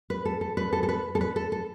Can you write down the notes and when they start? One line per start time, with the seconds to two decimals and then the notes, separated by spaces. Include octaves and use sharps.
0.10 B4
0.25 A4
0.41 A4
0.57 B4
0.73 A4
0.83 A4
0.89 B4
1.15 A4
1.21 B4
1.36 A4
1.52 A4